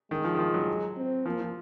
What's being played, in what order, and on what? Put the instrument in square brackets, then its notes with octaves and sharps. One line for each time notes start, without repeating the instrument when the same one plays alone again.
[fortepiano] D#3 [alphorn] G#3
[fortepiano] F3
D#3
F3
F#3
[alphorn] C4
[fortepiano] F3 [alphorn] A#3
[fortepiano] F3